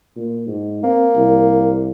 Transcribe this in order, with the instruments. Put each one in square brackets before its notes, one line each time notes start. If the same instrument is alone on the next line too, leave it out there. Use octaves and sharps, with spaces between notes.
[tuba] A#2
G#2
[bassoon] A#3 [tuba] C4
[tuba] C2